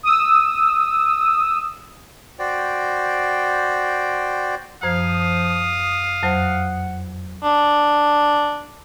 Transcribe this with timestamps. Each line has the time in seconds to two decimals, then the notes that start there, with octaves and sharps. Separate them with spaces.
0.03 D#6 E6
2.39 F#4 C5 D5 G5
4.83 F#2 F3 C5 F5 D#6 G#6
6.23 F2 F#3 C5 F#5
7.43 D4